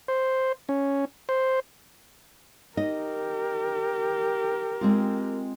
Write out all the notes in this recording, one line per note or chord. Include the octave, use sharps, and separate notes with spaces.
C5
C#4
C5
D#4 G4 A#4 D#5
G#3 C4 F4